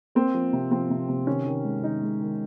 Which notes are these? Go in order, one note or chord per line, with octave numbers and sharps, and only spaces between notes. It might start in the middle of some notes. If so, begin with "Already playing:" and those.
A#3 C4
F3
C3
F3 C4
C3
C3
D#3 C#4
D#3
G#3
D#3 D#4
G#3
D#3